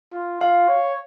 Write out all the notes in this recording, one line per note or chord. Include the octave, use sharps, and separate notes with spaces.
F4
F4 F5
C#5